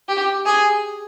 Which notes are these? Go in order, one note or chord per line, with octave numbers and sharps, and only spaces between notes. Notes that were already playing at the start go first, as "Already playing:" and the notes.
G4
G#4